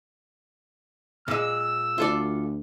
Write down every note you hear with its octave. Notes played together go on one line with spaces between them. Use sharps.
A#2 G#3 E6
D2 F4 A4 D5